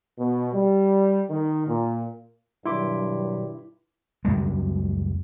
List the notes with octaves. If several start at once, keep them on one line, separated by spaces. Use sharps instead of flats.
B2
G3
D#3
A#2
G2 B2 D#3 F#3 E4 C6 D6 B6
C#2 F#2 G3 G#3